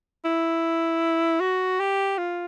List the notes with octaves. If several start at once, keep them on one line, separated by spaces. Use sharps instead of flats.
E4
F#4
G4
F4